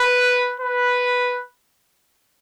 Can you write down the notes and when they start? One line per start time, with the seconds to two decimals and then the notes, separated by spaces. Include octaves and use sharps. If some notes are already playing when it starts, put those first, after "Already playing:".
Already playing: B4
0.60 B4